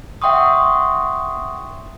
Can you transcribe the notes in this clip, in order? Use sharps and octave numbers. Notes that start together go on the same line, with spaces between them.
E5 F#5 G5 C6 C#6 D#6